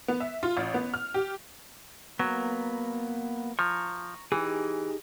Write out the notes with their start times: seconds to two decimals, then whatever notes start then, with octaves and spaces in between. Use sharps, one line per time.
0.08 B3
0.20 E5
0.43 F4
0.57 A1
0.74 B3
0.94 F6
1.14 G4
2.19 F#3 A#3 B3
3.59 F3 A#5 C#6
4.32 E3 D#4 G4 G#4